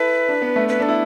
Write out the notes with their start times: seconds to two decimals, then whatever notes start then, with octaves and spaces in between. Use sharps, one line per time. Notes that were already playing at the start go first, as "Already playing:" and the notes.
Already playing: E4 A4 B4
0.29 D4
0.42 B3
0.56 A3
0.69 B3 B4
0.80 D4
0.82 A4
0.88 E4